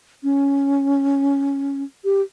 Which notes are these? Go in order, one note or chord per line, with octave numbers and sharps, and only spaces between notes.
C#4
G4